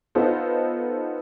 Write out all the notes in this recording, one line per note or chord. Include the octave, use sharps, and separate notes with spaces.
B3 D#4 F4 A4 C5